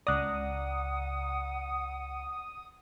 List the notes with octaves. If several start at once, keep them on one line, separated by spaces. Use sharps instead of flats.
C#2 D5 F#5 A#5 D#6 F#6